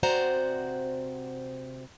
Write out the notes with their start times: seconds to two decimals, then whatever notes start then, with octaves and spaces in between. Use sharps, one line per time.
0.03 C3 F#4 C5 D5 F#5 A#5